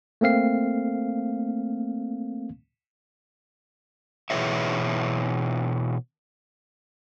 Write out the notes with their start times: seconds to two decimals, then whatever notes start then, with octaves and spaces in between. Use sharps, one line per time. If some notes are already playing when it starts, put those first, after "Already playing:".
0.21 A3 A#3 C4 F5 C7
4.30 B2 E3 G#4 B4 C#5 E5